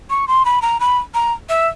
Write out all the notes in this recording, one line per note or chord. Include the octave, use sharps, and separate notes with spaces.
C#6
C6
B5
A#5
B5
A#5
E5